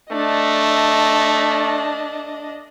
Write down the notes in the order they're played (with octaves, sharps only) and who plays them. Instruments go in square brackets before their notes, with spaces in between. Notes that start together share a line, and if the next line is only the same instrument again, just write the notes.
[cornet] A3 [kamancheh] D4 D#5